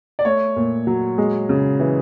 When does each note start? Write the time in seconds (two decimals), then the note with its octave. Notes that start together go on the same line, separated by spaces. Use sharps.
0.19 D5
0.25 A3 C#5
0.56 A#2
0.87 F#3
1.18 G#3
1.49 C#3
1.80 E3